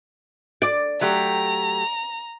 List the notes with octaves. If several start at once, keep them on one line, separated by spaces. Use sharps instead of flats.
D5
F#3 A3 G4 A#5